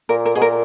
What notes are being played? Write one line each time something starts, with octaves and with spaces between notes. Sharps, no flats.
A#2 A#4
A#4
B2 G#4
A#2 A#4